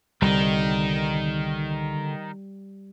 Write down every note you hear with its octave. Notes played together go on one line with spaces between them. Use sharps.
C2 D3 D#3 G3 D#4